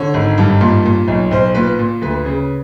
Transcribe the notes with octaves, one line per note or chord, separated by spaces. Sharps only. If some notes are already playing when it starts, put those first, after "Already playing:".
Already playing: D3 C#5
G#1
G2
A#2
A#2
B1
B1 C5
A#2 B4
A#2
D2 B4
C#3